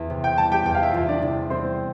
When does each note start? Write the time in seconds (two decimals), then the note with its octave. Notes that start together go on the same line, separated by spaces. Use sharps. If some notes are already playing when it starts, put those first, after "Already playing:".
Already playing: E2
0.10 C3
0.24 G5
0.38 G3 A5
0.52 G4 G5
0.66 E2 G5
0.75 F5
0.83 E5
0.91 E2 F4 F5
1.09 D4 D5
1.22 C3
1.50 G3 C4 C5